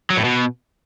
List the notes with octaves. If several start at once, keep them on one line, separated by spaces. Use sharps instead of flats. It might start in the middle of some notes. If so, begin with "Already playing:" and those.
F#3
A2
B2